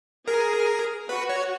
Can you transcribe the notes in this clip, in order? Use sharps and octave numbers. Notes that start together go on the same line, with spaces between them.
G#4 A#4
F#4 B4
C#5